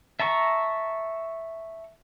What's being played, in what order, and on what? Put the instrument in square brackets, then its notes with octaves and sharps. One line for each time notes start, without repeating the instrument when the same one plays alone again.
[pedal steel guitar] E5 A5 A#5 C#6